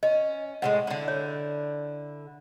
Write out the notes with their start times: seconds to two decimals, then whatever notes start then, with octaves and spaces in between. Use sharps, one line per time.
0.03 C#4 D#5
0.62 A2 F#3 G#3 F#5
0.87 D3 E4
1.08 C#5